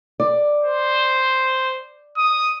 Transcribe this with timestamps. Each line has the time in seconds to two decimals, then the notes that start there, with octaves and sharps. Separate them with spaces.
0.20 D5
0.64 C5
2.18 D#6